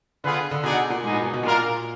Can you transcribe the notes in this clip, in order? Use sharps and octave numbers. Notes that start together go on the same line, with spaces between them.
D3 B3 F4 G#4 B4
D3
B2 D#4 G#4 D5 F#5
A#2
G#2 B3 D#4 G#4
A#2
B2
B2
A#2 G#3 D4 F4 A#4 F5